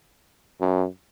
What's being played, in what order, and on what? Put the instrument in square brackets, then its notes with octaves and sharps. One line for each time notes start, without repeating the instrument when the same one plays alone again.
[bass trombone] F#2